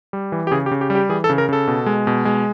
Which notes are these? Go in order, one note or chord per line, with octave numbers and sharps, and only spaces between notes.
G3
E3
G4
C#3 G#4
G4
C#3
G4
G3
G4
E3 G#4
A4
C#3
A#4
C#3 A4
B2
G#3
B2
G#3